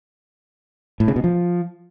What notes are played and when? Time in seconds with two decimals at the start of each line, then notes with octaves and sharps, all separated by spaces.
1.00 A2
1.08 C#3
1.16 B2
1.24 F3